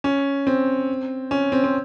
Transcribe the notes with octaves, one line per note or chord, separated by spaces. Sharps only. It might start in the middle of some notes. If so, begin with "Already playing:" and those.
C#4
C4
C#4
C4
C4